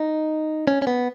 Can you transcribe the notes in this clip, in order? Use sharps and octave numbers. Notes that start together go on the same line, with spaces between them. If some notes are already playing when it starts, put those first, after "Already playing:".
Already playing: D#4
C#4
C#4
B3